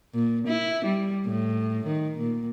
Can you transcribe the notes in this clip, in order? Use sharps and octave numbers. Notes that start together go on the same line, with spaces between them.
A#2
E4
G3
A2
D#3
A#2